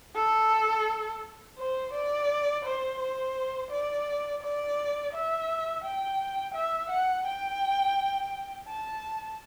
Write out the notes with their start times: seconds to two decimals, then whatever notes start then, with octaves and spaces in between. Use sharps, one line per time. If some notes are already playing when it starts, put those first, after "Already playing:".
0.16 A4
1.58 C5
1.93 D5
2.65 C5
2.99 C5
3.71 D5
4.43 D5
5.13 E5
5.84 G5
6.55 E5
6.90 F#5
7.26 G5
8.68 A5